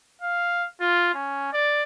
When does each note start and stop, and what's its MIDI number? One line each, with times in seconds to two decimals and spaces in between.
0.21 0.66 77
0.80 1.11 65
1.14 1.48 61
1.52 1.83 74